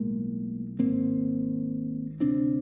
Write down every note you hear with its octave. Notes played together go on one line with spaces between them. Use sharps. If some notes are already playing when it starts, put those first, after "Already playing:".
Already playing: B1 A2 G#3 A#3
G#1 G#2 A#3 C4
D2 C3 C4 D4